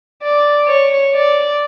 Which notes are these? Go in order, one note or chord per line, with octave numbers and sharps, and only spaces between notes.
D5
C#5
D5